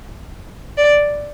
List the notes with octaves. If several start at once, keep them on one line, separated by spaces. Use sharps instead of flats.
D5